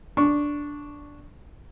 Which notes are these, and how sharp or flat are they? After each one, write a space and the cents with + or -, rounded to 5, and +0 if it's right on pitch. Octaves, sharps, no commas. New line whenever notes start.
D4 -5 C#6 +0